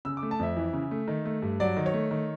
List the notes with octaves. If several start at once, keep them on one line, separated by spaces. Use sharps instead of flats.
C#3 E6
D6
A3
A5
F2 E5
E3
C#3
A3
D#3
A3
G2
F#3 D5
D#3
C#5
A3
D#3